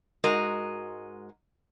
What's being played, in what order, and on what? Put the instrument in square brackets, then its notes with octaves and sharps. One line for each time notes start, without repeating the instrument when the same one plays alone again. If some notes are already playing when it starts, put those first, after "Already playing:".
[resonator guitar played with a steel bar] G#2 G#3 F#4 A#4 D#5